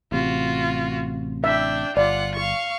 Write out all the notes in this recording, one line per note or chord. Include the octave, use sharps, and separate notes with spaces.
A1 C3 F4 F#4
D4 E5 G5
G1 F4 D5 F#5
F5 C#6